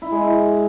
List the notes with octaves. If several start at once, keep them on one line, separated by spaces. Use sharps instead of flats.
E4
G#3
E4